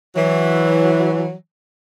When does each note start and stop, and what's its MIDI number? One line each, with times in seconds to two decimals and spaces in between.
0.16 1.33 52
0.16 1.33 54